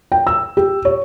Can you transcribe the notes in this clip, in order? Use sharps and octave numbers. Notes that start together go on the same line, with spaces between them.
G5
E6
G4
C#5